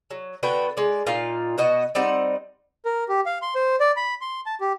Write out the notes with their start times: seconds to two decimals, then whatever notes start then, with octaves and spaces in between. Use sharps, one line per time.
0.11 F#3
0.43 D3 B3 F#4 G5
0.77 G#3 D5
1.06 A#2 D#4 F4 F5
1.58 B2 F#4 D#5
1.95 G3 C4 D#4 F#5
2.85 A#4
3.09 G4
3.26 F5
3.42 C6
3.55 C5
3.80 D5
3.96 B5
4.21 C6
4.46 A5
4.60 G4